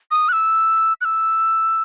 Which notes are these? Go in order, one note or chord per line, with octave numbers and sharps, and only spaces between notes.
D#6
F#6
E6
F#6
E6